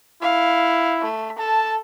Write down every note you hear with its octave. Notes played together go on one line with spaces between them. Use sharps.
E4 F5
A3
A4 A5